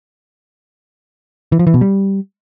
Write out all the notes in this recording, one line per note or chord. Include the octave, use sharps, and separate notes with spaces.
E3
F3
E3
B2
G3